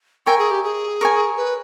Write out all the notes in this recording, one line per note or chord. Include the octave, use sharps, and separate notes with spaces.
A#4 C#5 E5 G5 G#5
G#4
G4
G#4
A#4 C#5 G#5
B4